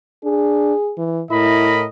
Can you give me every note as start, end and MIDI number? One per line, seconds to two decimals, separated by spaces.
0.24 0.73 62
0.24 0.93 68
0.97 1.22 52
1.31 1.86 45
1.31 1.77 64
1.31 1.87 70
1.31 1.87 75
1.31 1.87 83